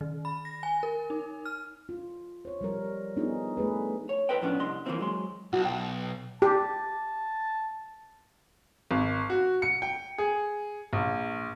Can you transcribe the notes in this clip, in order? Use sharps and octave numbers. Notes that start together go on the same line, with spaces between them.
D#3
B5
A#6
G#5
A#4
D#4
F6
F4
C5 C#5
F3 G3 A#4
B3 D4 D#4 F4 G#4
A3 G#4 B4
C#5
A4 B4 C5 D#5 G5
A2 F3 B3 C#4 D4
C2 D4 D#5 C6
E3 F3 G#3 A#3 C4 E4
F#3 G#3 C6
B1 F#4
G5
G4 A5
G#1
F#4
C#7
G5
G#4
A#1